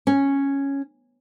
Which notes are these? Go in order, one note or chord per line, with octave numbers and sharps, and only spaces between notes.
C#4